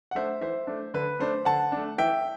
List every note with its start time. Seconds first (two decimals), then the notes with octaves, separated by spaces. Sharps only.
0.11 F#5
0.15 A3 D4 C5 E5
0.41 E3 C5 E5
0.67 A3 D4
0.94 D3 B4
1.19 A3 D4 C5
1.45 D3 F#5 A5
1.72 A3 D4
1.98 E3 E5 G5